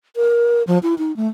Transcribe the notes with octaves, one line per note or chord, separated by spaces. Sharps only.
A#4
F3
E4
D#4
A3